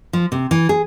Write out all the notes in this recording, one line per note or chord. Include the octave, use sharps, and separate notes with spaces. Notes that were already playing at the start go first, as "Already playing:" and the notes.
F3
C3
E3
G#4